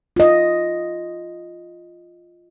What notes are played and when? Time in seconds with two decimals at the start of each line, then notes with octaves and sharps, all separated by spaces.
0.16 F4 D#5